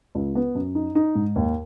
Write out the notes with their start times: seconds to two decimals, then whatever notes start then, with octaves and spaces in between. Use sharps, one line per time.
0.15 C#2
0.35 B3
0.55 F#2
0.75 D#4
0.95 D#4
1.15 G#2
1.36 D#2